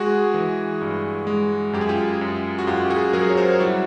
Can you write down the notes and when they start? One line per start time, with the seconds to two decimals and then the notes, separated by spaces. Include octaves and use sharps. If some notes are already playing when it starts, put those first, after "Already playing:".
Already playing: G#3 F#4 G#4
0.34 E3
0.81 G2
1.27 G#3
1.73 F#2 G4
1.81 G#4
1.89 F4 G4
2.21 F#2
2.58 F#4
2.67 F#2 F4 G4
2.85 G4
2.90 F#4 G#4
3.13 F#3 G#4 A#4
3.30 C#5
3.37 A#4 C5
3.60 G3 E4 F#4